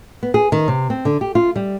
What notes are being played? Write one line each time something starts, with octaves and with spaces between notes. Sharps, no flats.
B3
G#4
D#3
C3
C4
D3
G4
F4
G3